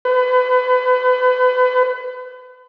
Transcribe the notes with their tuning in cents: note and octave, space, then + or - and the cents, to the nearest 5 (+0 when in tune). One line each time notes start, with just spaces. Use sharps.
B4 +35